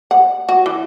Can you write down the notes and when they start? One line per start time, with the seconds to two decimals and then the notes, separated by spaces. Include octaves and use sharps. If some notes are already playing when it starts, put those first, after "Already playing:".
0.11 F#5
0.49 F#4
0.66 E3